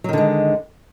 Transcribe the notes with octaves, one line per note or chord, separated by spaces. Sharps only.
D3 D#3 F#3 G#3